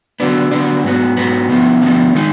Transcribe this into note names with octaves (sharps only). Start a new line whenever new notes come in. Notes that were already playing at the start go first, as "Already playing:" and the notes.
D3 F#3 B3 D4
D3 F#3 B3 D4
G#2 F#3 B3
G#2 F#3 B3
D3 F3 B3
D3 F3 B3
D#3 G#3 D#4